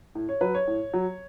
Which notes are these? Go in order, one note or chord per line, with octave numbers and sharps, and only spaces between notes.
A2
C#5
F#3 B4
C#5
A2
F#3